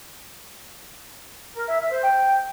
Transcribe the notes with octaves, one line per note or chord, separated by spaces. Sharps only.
A#4
E5
E5
C5
G5